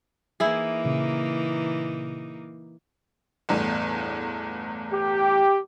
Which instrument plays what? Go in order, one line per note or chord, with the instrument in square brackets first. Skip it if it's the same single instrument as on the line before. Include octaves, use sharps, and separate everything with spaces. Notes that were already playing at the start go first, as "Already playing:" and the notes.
[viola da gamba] E3 A#3 D#4 [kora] E4 G#4
[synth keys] A#2 C#3
[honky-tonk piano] G1 E2 A2
[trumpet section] G4